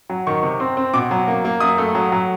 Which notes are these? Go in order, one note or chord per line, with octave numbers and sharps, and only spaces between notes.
F#3
D#3 C#6
C3
C4
C4
B2 D6
F#3
A#3
A#3
F#2 D#6
A3
F#3
F#3